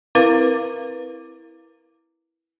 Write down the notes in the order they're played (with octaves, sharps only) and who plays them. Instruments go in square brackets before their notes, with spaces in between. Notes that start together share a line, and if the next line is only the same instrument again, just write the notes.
[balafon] C4 E4 A#4 B4 F5